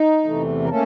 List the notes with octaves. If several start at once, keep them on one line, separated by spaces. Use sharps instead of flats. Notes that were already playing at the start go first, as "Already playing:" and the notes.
Already playing: D#4
E2 C3 E3 A3
A#4
A3 A#3 C#4 A4